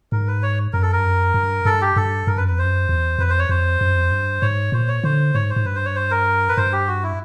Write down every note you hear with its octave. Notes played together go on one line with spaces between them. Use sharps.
G#2 A#4
B4
C#5
F#2 A#4
A4
A#4
G2
F#2
G2
G2 A4
G4
G2 A4
G2 A#4
F#2 B4
F2 B4
C5
F#2
E2
F2 B4
C5
C#5
F2 C5
F#2
F2
G2
G#2 C#5
A#2 C5
C#5
D3 C5
G#2 C#5
C5
G#2
G2 B4
C5
C#5
C5
A#4
B4
G2 C5
G4
F#4
E4